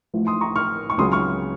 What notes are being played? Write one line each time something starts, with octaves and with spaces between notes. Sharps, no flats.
A1 A2 F3
C6 D#6
A#5 C#6
C#6 F6
C#6
C#2 C#3 F#3 C6 D#6
C#6 F6